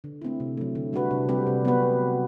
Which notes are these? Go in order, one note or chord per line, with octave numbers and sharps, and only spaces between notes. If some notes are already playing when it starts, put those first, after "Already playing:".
D3
A3 C4 E4
C3
F#3 A3
D3
G3 D4 F#4 B4
C3
G3 C4 G4 B4
C3
F#3 B3 F#4 B4